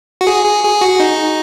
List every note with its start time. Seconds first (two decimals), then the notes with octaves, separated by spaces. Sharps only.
0.21 F#4
0.27 G#4
0.45 G#4
0.64 G#4
0.81 F#4
1.00 D#4